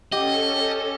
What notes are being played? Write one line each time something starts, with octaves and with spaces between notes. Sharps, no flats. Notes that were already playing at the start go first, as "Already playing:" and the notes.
C#4 G4 A4 D#5